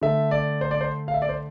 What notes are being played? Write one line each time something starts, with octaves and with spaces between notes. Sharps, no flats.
D3 A3 E5
D5
C5
D5
C5
F5
E5
D5
C5